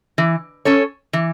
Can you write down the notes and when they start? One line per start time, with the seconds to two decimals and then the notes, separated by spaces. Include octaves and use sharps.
0.18 E3
0.65 C#4 A4 C#5
1.13 E3